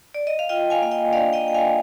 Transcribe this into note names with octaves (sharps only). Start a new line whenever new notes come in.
D5
D#5
F5
F4 D#5 G5
F5 G#5
A#3 F5
D#5 G5
D4 D5 F5
D#5 G5
A#3 G5
F5 G#5